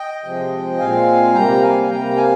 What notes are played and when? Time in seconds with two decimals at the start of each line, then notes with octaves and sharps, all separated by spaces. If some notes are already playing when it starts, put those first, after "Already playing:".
Already playing: D#5 G5
0.24 C3 F3 G#3
0.79 A#2 G#3 C4 F5 G#5
1.34 C3 G3 A#3 G5 A#5
1.61 F5 G#5
1.83 G#5
1.89 C3 G3 A#3 G5 A#5
2.17 F5 G#5